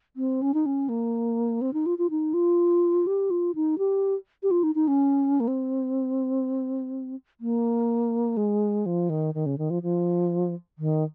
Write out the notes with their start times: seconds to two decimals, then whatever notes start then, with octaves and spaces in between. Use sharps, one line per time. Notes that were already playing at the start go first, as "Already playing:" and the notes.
0.16 C4
0.42 C#4
0.54 D#4
0.66 C#4
0.89 A#3
1.61 C4
1.73 D#4
1.86 F4
1.98 F4
2.10 D#4
2.34 F4
3.07 G4
3.30 F4
3.55 D#4
3.78 G4
4.43 G4
4.51 F4
4.63 D#4
4.75 D#4
4.88 C#4
5.40 A#3
5.48 C4
7.40 A#3
8.37 G#3
8.86 F3
9.09 D#3
9.34 D#3
9.46 C#3
9.58 D#3
9.70 F3
9.83 F3
10.78 D#3